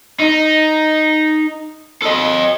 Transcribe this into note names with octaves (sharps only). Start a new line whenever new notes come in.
D#4
A4 D#5